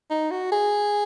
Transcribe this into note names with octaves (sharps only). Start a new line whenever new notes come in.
D#4
F#4
G#4